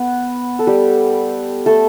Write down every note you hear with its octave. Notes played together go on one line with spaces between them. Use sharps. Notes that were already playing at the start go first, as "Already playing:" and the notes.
Already playing: B3
A4
G3 G4
A3 A4